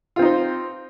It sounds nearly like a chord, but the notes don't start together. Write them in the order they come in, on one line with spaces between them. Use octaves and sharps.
F4 C4 D#4 C5